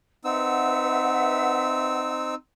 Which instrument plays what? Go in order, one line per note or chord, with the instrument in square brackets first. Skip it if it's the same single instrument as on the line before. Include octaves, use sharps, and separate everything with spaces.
[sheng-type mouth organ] C4 D#4 E6 [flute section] B4 E5 F#5